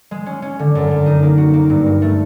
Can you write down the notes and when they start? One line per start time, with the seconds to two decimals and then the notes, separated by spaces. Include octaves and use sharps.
0.11 G#3
0.26 C#4
0.42 C#4
0.59 D3
0.75 F#2
0.91 F#2
1.06 D#4
1.23 A#3
1.38 F#4
1.54 A#3
1.70 G2
1.86 A#3
2.02 A3